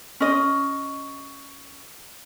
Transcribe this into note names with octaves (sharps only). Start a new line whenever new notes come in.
C#4 D#5